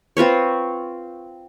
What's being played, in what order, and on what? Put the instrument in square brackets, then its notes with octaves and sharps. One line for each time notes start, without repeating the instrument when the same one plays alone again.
[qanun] C4 F4 B4 C#5